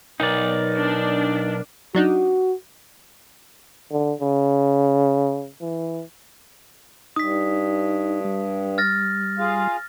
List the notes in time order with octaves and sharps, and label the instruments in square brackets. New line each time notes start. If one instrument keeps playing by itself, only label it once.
[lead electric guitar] B1 [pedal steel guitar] D#4 D5 [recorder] A#4
[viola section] D4
[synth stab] F#3 D4 D#4 [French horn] F#4
[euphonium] D3
C#3
E3
[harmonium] G2 [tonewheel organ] D#4 [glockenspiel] D#6 B6
[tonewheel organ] G3
[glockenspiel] F6 A6 A#6
[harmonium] F4 G#4 F5